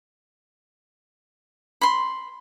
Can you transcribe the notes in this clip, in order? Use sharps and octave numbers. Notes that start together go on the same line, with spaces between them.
B5 C6